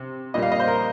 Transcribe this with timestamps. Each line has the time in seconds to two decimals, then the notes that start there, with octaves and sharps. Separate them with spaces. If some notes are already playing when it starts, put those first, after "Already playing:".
Already playing: C3
0.34 A#2 G3 D#5
0.43 F5
0.52 D#5
0.60 C5
0.68 A#4